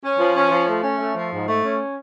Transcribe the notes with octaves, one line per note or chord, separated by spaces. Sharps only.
C#4
F3
C#4
F3
A3
C#4
A3
F3
G#2
A3
C#4